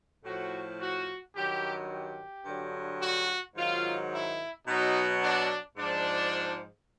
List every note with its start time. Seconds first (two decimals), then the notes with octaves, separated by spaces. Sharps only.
0.24 A2 F3 F#4
0.80 F#4
1.35 G2 D#3 F#3 G4
1.90 G4
2.46 G2 D3 F#3
3.01 F#4
3.56 G#2 D#3 F#3 F4
4.12 E4
4.67 B2 F#3 D#4
5.22 D4
5.77 G#2 F3 D4